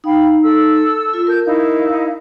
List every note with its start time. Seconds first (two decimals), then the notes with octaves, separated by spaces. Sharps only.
0.04 D#4 F5 G5 B5
0.43 A4 E6
1.14 F4
1.27 A#4 A5 G6
1.46 D#4 E4 F5